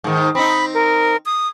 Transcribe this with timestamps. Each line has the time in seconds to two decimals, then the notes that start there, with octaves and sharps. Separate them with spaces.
0.04 G#2 D#3
0.35 C4 D#4 B5
0.74 A#4
1.26 D#6